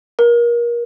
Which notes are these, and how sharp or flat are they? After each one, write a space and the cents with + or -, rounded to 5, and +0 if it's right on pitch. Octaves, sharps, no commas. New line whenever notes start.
A#4 +25